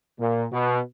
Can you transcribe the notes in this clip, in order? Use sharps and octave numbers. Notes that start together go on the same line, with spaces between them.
A#2
B2